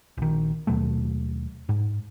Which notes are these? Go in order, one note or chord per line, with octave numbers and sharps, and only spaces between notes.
A#1 D#3
D#2 B2 F#3 A3
G#2